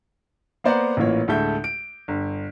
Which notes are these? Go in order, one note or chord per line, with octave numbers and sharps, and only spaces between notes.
A#3 B3 C5 D5 F#5 A#5
A1 A#2 E3 A#3 C#5
D2 A2 G#3 A4 E5 G6
D7
G1